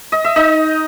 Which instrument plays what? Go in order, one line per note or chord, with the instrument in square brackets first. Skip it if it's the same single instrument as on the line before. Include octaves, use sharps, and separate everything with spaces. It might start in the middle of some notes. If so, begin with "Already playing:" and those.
[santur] D#5
E5
D#4 D#5